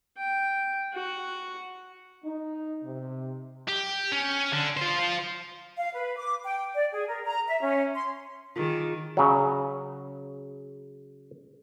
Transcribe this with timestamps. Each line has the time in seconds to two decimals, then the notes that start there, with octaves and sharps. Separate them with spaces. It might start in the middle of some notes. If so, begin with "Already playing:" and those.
0.18 G5
0.94 F#4
2.24 D#4
2.82 C3
3.68 G4
4.12 C#4
4.53 D3
4.77 F4 C5
5.77 F5
5.94 B4
6.17 D6
6.43 G5
6.74 D5
6.93 G#4
7.07 A#4
7.25 A#5
7.48 E5
7.62 C#4
7.95 C6
8.56 D#3 F4 G#4
9.17 C#3 F#3